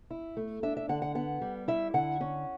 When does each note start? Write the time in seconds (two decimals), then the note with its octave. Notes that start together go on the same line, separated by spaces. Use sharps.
0.11 E4
0.37 A3
0.63 D4 E5
0.77 E5
0.89 D3 F#5
1.02 F#5
1.15 B3 F#5
1.41 G3
1.68 E4 E5
1.94 D3 F#5
2.21 C#4